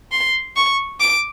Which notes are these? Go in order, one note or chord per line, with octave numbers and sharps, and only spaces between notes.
C6
C#6
D6